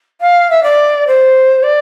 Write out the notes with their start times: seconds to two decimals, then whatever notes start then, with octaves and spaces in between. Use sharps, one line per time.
0.20 F5
0.50 E5
0.63 D5
1.07 C5
1.62 D5